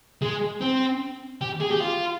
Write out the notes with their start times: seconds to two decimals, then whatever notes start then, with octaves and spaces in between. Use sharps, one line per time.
0.22 G#3
0.61 C4
1.41 G4
1.61 G#4
1.71 G4
1.81 F4